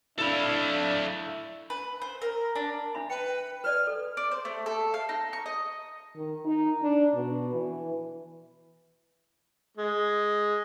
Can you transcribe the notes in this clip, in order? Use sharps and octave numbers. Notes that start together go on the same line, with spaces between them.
A2 D4 E4 A4 E5 F5
B4
C5
A#4
D4
D4 E5 B5
B4 G5
B4 D5 D#5 F6
A4
D5
C5
A3
A4
F5
D#4
C#6
D#5
D#3
D#4
D4
B2
E3
G#3